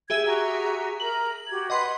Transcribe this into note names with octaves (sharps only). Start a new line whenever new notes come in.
G4 G#4 E5 G#6
F#4 A#5
A#4 A#5 F#7
F#4 G4 G#6
B4 D#5 F#5 C6